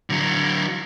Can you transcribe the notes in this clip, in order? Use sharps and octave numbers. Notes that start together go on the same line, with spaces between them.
D3 F#3